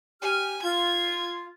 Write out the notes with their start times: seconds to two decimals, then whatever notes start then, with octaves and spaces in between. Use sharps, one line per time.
0.22 G4 G#5 F6
0.63 F4 G#6